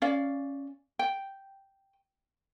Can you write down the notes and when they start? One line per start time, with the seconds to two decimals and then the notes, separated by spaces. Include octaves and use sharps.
0.02 C#4 D5 F5
0.99 G5